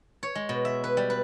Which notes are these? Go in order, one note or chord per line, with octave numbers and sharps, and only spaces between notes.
C#5
G#3
B2
E5
B4
G3
B4